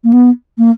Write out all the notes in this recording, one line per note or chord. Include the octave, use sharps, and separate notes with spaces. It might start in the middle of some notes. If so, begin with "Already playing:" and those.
A#3
B3
A#3